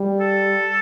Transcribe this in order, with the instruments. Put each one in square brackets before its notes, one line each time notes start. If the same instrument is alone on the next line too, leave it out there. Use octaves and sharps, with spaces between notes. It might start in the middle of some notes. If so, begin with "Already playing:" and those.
Already playing: [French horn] G3
[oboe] A4